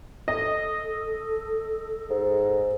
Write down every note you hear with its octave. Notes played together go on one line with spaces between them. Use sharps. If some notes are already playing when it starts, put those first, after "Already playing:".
A4 D#5
G#2